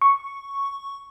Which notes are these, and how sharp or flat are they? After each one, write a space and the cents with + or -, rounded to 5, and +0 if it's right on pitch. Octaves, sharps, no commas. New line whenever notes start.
C#6 +0